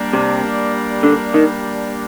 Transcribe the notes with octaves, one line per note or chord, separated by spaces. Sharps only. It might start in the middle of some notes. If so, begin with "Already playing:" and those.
Already playing: G3 A#3 D4
C3
D3
D#3